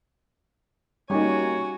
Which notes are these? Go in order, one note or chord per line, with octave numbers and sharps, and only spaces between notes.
G3 A#3 C#4 D#4 F#4 G4 C#5 G#5